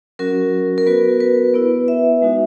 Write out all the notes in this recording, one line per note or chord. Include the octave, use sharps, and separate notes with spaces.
F#3 C#4 F#4 A#4
A#4
B3 F#4 B4
B4
B3 E4
E5
G#3 D#4 F#4